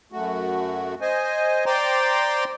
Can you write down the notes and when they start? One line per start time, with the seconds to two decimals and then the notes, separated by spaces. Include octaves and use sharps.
0.12 F#2 A3 F#4
1.01 C5 D#5 G#5
1.66 C5 D5 G5 A#5 C6 D6